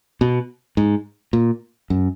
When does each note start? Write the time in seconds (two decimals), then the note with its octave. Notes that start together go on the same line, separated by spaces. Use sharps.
0.21 B2
0.77 G#2
1.33 A#2
1.90 F#2